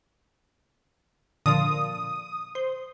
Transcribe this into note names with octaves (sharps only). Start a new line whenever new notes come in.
A#2 D3 F3 D#6
C5